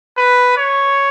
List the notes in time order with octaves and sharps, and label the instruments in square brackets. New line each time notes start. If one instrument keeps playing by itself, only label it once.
[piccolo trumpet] B4
C#5